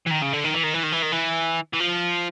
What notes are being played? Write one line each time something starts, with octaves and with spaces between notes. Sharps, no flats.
E3
D#3
C#3
D3
D#3
E3
D#3
E3
D#3
E3
D#3
E3
E3
F3